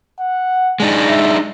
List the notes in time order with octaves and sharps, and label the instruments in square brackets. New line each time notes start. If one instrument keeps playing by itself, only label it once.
[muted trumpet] F#5
[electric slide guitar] G#3 D4 D#4
[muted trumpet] E5